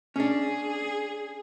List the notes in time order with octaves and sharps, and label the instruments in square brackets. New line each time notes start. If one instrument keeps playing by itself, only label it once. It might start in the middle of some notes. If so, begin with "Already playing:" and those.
[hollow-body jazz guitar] C#4 D4 [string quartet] G#4